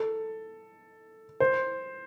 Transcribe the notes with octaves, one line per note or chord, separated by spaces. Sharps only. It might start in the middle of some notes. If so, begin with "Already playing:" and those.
Already playing: A4
C5